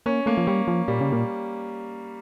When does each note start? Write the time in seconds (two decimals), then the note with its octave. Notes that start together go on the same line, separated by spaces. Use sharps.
0.06 A#3 C#4
0.26 A3 A#3
0.37 F3
0.47 G3 C#4
0.68 F3
0.88 A#2 G3
1.01 C#3
1.12 A#2